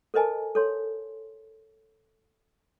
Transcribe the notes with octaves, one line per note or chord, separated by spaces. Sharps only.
A4 A#4 C5 D#5 G#5 A5
A4 C#5 C6